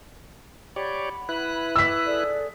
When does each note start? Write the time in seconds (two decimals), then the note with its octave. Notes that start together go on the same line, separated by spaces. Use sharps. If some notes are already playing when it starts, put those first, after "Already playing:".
0.76 G4 C#5 D5 F#5 B5
1.29 E4 B4 F#6
1.76 D6 E6 B6
2.04 G#4 A4 D5